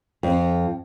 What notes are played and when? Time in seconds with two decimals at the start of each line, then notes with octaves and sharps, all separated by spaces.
0.23 F2